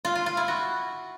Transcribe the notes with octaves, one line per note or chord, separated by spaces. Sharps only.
F4
F4
F4
E4
F#4